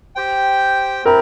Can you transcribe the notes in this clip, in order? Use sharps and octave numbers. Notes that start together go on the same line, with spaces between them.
G4 C5 G5
C4 E4 G4 A#4